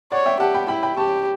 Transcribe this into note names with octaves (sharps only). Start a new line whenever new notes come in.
C#5 D5 F#5
E5 G5
G4 F#5 A5
G5 B5
E4 G5 B5
G5 B5
G4 A5 C#6